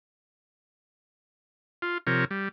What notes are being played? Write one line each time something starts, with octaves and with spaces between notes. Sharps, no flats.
F4
C3 F3 A#4 C#5
G3